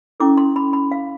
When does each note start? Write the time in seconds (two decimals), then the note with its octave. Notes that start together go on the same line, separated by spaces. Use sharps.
0.20 C#4 E4 A4 D6
0.37 C6
0.56 B5
0.73 B5
0.91 F5